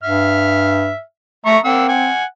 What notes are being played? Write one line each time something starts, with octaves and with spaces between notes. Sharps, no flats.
G2 E5 F6
A3 E5 A#5 C#6
A#3 C4 F#5 E6
F#5 G#5